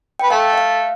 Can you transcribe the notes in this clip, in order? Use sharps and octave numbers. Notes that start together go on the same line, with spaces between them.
B4 G5
A3 A4 F5
E5
F5